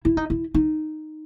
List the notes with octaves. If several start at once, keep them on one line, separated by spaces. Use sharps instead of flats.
E4
D#4
E4
D#4